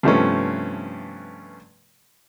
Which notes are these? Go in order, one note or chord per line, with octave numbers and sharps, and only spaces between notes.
G2 C3 F3 A3 B3 C#4